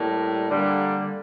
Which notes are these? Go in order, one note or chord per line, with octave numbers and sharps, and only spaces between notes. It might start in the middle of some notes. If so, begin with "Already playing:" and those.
Already playing: A2 G3 A#3
D3 G3 A#3